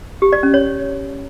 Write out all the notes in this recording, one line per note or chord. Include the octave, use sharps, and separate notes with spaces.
G4
D5
C#4
C#5